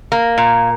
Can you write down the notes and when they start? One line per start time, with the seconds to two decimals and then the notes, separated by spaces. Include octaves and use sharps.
0.12 A#3
0.38 A#2